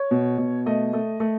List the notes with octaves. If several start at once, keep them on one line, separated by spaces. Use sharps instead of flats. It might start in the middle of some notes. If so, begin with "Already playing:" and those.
Already playing: C#5
B2
B2
A3 D#5
A3
A3